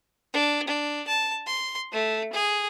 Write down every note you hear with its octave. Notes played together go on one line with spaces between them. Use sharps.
D4
D4
A5
C6
A3
G#4